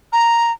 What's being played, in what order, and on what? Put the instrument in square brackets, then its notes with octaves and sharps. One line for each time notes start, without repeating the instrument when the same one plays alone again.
[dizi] A#5